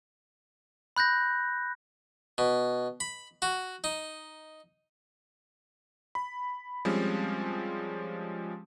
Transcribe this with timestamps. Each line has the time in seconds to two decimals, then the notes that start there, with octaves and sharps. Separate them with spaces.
0.96 B5 F#6 G6 A#6
2.38 B2
3.00 B5
3.42 F#4
3.84 D#4
6.15 B5
6.85 F3 G3 G#3 C4 C#4